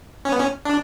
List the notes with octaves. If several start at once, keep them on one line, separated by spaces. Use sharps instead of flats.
C#4
B3
C#4
D4